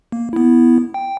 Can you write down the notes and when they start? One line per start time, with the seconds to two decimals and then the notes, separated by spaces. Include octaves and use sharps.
0.12 A#3
0.33 B3 E4
0.94 G5